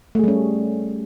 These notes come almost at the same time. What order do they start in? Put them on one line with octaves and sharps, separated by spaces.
A3 G#4 G3 C#4